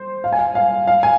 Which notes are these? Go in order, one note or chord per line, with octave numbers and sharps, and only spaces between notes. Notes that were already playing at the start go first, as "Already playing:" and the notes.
Already playing: C5
F5
G#5
F5
F5
F5
G#5